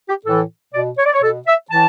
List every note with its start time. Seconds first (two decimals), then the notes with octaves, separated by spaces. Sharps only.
0.09 G4
0.25 A2 E3 A4
0.74 B2 D5
0.98 C#5
1.06 D5
1.13 C#5
1.23 B2 A4
1.47 E5
1.71 A2 E3 A5